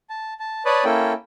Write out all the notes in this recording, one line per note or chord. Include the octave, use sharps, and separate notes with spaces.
A5
A5
B4 C#5 D5 A5 B5 D#6
A#3 C#4 E4 A4 G5